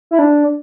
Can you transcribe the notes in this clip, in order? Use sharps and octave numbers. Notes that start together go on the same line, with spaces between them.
E4
D4